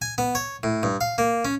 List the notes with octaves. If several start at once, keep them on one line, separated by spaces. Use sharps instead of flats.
G#5
B3
C#5
A2
G2
F5
A#3
C#4